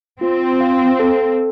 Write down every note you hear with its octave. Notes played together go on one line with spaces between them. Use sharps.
C4 F4
F5
A4